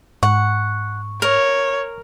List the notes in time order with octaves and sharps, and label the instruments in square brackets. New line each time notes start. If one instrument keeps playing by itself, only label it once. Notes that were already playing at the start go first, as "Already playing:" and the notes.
[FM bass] G#2 [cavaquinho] F#5 [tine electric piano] C#6
[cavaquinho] A#4 [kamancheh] C#5